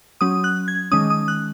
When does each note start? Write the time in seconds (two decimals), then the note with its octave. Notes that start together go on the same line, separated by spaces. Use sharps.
0.21 F#3 C#4 D#6
0.44 F#6
0.68 G#6
0.92 D#3 G#3 C#4 D#6
1.10 D#6
1.28 F#6